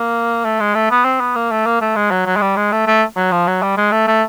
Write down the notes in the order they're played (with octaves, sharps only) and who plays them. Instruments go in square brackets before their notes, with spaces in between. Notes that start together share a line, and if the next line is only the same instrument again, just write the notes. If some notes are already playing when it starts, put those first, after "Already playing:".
Already playing: [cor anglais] A#3
A3
G#3
A3
B3
C4
B3
A#3
A3
A#3
A3
G#3
F#3
F#3
G#3
G3
G#3
A3
A3
F#3
F3
F#3
G3
G#3
A3
A3